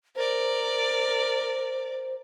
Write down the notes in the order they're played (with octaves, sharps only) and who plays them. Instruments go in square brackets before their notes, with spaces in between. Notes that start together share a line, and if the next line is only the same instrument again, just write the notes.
[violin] A#4 D5 [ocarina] C5